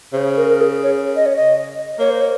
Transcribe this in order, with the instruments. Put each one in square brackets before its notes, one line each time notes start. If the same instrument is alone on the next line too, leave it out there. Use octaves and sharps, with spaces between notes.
[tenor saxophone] C#3 [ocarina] C5
[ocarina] A#4
A#4
G#4
C#5
D#5
C#5
D#5
[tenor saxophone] A#3 [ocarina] C#5
[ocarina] C5
C#5